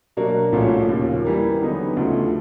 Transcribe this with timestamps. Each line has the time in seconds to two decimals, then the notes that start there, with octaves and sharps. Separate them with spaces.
0.17 B2 F#3 A#3 D4 F#4
0.53 C2 A#2 F3 A3 C#4
0.89 D#2 C#3 F3
1.25 E3 G3 A#3
1.61 D3 F#3 B3 D#4
1.97 D2 C#3 F3 A3